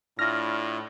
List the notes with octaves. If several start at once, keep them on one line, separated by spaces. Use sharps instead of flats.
A2 D4 E4 F4 F6 A#6